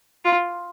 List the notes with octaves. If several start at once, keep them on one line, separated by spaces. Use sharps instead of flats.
F4